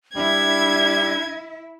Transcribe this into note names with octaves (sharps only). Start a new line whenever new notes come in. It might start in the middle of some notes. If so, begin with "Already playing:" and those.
G3 D4 E4 E5 G#6